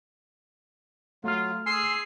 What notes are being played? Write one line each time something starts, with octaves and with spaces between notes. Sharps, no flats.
F#3 A3 F4 F6
G#4 G#5 C6 E6 C7